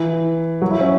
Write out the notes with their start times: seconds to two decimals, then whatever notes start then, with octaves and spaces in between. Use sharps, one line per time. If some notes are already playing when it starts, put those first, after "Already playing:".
Already playing: E3
0.62 F#3
0.71 E4
0.81 C#4